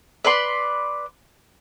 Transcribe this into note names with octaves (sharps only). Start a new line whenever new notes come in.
B4 D5 C6